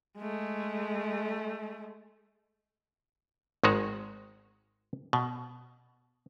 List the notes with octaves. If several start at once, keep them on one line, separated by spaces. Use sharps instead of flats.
G#3 A3
G#1 D#3 G#3 F#4 C#5
B2